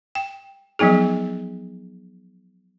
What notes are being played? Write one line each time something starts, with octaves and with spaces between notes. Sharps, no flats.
G5
F3 F#3 B3 D#4 G#4